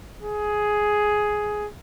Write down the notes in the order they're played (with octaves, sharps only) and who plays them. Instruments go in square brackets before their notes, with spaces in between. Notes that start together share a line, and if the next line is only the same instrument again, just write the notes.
[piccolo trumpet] G#4